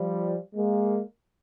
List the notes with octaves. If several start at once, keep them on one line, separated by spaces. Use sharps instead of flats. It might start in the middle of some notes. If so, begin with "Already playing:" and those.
Already playing: F3 G3
G#3 A#3